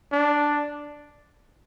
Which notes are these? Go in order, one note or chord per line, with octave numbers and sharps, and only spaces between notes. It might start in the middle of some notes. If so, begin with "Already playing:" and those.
D4